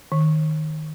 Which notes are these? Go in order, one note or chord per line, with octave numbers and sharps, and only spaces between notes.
D#3